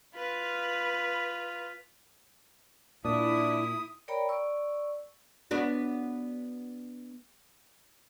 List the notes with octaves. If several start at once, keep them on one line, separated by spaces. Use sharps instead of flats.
F4 B4 B5
A#2 D4 E4 D#6
A#4 C#5 D5 G5 A#5 B5
D5 C#6 E6
B3 D4 F#4